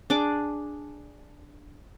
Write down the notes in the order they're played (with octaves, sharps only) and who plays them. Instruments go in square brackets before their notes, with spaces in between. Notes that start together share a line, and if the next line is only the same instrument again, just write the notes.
[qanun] D4 G#4 D6